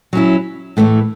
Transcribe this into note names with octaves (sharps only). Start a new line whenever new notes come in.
F#3 C#4 E4
A2 E3 A3